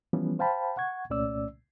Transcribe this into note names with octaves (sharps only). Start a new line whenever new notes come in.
E3 F3 G3 B3 C#4
C5 F5 G5 A5 B5
F#5 C#6 G#6
C2 A#2 A3 C#4 D5 E6